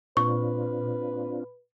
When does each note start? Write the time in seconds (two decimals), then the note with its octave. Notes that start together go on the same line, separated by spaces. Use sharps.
0.17 A#2 C4 D4 F4 B4 C#6